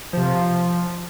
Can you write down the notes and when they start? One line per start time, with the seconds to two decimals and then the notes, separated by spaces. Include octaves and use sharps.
0.13 C3 F3
0.35 F3